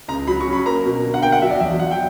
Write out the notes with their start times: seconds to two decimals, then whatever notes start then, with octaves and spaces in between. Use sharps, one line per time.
0.08 C#2 A#5
0.27 F#3 B5
0.41 C#6
0.47 C#4
0.53 B5
0.66 A#3 A#5
0.85 B2
1.04 D3
1.14 F#5
1.22 A#3 G5
1.32 F#5
1.42 F#3 E5
1.51 D5
1.60 E2 E5
1.79 F#3 F#5
1.91 G5